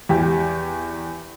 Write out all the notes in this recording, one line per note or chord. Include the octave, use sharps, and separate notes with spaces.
E2 G4